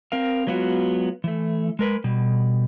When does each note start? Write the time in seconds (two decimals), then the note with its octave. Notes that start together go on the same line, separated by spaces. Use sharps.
0.12 C4 A#4 F5
0.47 F#3 G#3 B3 F4 F#4
1.24 E3 A3
1.79 G#3 A#4 B4
2.04 B2 G3